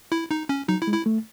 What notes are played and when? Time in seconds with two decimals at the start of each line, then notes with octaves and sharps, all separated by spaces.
0.12 E4
0.31 D#4
0.49 C#4
0.68 F#3 D#4
0.82 E4
0.87 G#3
0.94 E4
1.06 A3